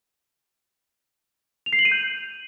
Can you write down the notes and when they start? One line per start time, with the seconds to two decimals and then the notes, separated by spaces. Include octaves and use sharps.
1.66 F7
1.73 C7
1.79 F#7
1.85 D#7
1.92 G6